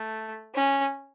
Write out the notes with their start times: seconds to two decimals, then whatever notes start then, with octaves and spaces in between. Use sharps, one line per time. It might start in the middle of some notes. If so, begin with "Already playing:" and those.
Already playing: A3
0.55 C#4